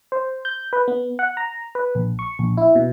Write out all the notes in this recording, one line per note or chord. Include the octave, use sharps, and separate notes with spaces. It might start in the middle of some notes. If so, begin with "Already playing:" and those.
C5
G6
B4
B3
F#5
A#5
B4
A#1
C#6
A#1
E4
B2